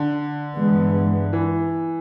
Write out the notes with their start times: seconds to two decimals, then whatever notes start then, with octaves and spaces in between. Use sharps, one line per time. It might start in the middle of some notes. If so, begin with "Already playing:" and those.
Already playing: D3
0.56 G2 E3 G#3 B3
1.33 E3